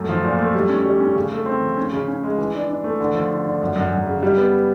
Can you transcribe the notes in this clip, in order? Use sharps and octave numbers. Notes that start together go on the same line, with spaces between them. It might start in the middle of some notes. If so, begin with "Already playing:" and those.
Already playing: F#2 A3
F3
A#2
A3
G3
C#4
G3
C#4
C#3
A3
C4
F3
C#4
C#3
C#4
G#3
E3
D4
D4
A3
D3
F3
D3
D3
F#2
F#2
F#2
C#3
G3
B3